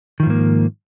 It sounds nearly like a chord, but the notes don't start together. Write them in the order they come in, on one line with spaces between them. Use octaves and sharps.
D#3 F3 G#2 A#3